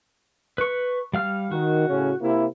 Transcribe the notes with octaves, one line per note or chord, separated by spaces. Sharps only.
B4 C#6
G3 F5 F6
D#3 F#4
A2 C#3 C#4
C3 A#3 E4